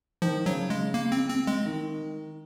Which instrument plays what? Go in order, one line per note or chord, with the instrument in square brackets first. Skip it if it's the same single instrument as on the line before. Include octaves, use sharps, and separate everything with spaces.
[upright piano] D#3 [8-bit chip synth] F3
[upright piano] C#3 [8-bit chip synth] F#3
[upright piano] C#3 [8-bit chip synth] G#3
[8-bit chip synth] A#3
C4
C4
G#3
[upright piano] D#3